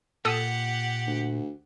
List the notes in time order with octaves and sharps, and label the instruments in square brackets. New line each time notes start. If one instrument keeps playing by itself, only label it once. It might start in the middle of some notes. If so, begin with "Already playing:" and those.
[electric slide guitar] A#2 F4 [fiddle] G4 F#5 [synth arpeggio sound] A4 D#6 E6
[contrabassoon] D2